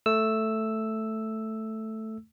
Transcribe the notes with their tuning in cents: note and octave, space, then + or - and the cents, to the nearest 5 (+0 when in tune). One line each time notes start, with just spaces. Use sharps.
A3 +0 E6 +0